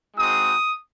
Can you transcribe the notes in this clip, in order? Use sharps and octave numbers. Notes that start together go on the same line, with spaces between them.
G#3 C4 D#4 F#4 D#6